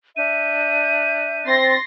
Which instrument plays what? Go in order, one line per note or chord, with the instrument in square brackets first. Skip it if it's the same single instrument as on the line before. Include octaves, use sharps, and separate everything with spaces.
[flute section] D4 E5 G6 [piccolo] D#7
[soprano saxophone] C4 [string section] C6 A6 A#6